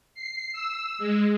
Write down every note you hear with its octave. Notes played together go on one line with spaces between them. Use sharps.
C7
E6
G#3